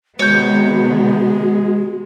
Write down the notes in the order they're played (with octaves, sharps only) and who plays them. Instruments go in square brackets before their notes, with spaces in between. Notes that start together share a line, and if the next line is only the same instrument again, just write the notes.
[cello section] C3 D#3 B3 [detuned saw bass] G#3 [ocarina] F#4 [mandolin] C#5 G6